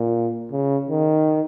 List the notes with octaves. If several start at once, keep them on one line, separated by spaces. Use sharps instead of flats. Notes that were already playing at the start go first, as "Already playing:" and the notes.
Already playing: A#2
C#3
D#3